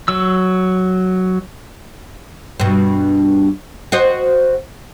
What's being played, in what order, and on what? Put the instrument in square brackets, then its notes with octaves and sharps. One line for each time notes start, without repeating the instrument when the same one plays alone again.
[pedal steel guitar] F#3 E6
[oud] G2 B2
F#4 C5 D#5